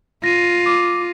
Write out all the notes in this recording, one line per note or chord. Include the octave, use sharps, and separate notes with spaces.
F4 A#6 D#7
D6